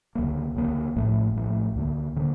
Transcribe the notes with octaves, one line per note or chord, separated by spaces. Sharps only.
D2 C#3 F#3 A#3
D2 C#3 F#3 A#3
A#1 A2 F3 A3
A#1 A2 F3 A3
D2 D3 F3 A#3
D3 F3 A#3